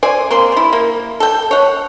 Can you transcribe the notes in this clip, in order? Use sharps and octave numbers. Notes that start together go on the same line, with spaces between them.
C5 D5 G#5
A#3 C4 C6
G3 E4
A#3
A4 G5
C#5 F#5